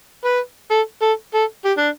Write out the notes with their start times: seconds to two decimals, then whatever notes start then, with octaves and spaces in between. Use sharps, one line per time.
0.25 B4
0.71 A4
1.02 A4
1.34 A4
1.65 G4
1.77 D4